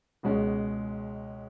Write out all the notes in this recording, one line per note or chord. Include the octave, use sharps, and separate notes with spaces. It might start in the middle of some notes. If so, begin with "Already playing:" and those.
C#2 B2 G#3 C#4